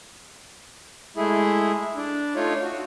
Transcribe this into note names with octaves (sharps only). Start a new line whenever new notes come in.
G#3 A3 E4 G#4
D4
A3 D#4 F4 C#5
F#4